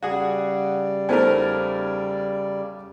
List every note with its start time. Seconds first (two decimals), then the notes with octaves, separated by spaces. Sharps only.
0.03 C#3 G3 F#4 G#4 D5
1.09 E2 A3 D#4 A#4 C5 G#5